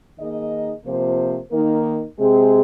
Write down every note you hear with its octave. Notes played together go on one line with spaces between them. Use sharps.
D#3 A#3 D#4 G#4 D#5
C3 F3 A#3 F4 C5
D#3 A#3 D#4 A#4
C3 G#3 C4 G#4